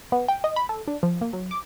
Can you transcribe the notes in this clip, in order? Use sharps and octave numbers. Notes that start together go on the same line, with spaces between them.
B3
G5
D#5
B5
A4
D4
F3
A#3
F#3
D6